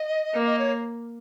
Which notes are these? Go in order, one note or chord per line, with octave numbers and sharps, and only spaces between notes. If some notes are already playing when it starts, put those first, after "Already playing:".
Already playing: D#5
A#3
D#5
C#5